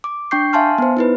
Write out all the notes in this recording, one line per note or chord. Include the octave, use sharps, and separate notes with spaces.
D6
D4 G5 C#6 G6 C7
E5 F5 G#5 A5 C6 F6
B3 C5
D#4 E4 B4